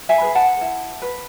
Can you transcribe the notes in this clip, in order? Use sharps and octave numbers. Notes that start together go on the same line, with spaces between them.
E5 G#5
G#4 B4
F#5 A5
E4
B4